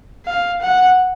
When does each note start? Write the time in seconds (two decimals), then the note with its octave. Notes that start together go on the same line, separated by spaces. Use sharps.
0.25 F5
0.61 F#5